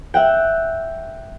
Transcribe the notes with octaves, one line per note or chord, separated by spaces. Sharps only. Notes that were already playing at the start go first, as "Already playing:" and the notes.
E5 F#5 G5